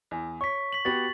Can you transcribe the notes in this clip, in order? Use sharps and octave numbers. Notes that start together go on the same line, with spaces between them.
E2
C#5 C#6 B6
B6 F#7
B3 F#4 G4 A6 F#7